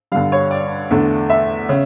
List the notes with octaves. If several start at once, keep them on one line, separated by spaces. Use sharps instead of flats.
G2 D3 G3 F5
C#5
D5
E2 D3 A3 D4
E5
C#3